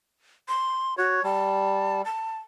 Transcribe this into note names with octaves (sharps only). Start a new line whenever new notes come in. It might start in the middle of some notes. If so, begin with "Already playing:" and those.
C6
F#4 C#5
G3 A5
A5